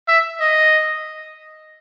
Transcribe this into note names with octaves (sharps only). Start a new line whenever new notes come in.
E5
D#5